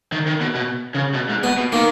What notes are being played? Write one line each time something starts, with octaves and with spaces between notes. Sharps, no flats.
D#3
D#3
B2
B2
C#3
B2
G#2
B2 B3
B2
D#3 A#3